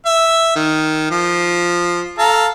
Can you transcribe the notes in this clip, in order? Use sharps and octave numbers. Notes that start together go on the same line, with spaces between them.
E5
D#3
F3
A4 F5 A#5